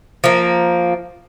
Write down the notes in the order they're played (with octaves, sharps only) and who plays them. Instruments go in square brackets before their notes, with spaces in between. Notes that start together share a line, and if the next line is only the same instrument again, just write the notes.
[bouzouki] F3 A#3